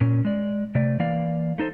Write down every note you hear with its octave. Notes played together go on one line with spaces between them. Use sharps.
A#2 C#4
G#3 D5
C3 A3 D5
E3 A#3 D5 F5
A3 D#4 A4 C5